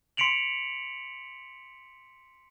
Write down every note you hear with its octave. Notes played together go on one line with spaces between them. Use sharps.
C6 B6 C#7 D7 F7 F#7